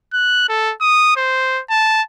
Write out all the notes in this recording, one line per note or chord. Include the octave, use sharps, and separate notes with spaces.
F#6
A4
D#6
C5
A5